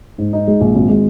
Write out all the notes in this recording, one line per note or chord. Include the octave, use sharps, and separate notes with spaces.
G#2
D#4
G#3
A#1
G#1
G#3